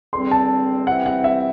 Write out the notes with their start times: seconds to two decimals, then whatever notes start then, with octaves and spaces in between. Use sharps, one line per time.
0.13 E2 D3 G3 C4 C6
0.31 A5
0.87 C3 E3 G3 C4 E4 F#5
1.06 F#5
1.24 E5